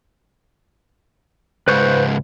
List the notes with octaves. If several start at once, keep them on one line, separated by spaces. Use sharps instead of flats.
C#2 G#2 B4 C5 C#6